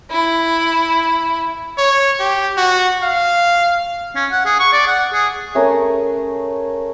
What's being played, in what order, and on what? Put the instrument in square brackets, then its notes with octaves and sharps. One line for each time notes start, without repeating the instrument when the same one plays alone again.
[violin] E4
[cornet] C#5
G4
F#4
F5
[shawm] C#4
F#5
G#4
C#6
D5
F#5
G#4
[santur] A3 C#4 G#4 A#4